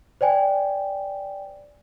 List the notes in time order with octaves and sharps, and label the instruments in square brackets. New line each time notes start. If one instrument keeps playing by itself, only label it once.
[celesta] C5 D5 G5 G#5